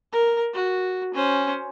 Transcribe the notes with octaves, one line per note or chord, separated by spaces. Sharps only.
A#4
F#4
C#4 C5